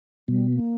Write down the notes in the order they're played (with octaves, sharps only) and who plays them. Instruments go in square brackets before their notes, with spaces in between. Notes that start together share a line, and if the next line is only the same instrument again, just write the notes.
[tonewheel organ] B2 [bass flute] G3
[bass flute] A#3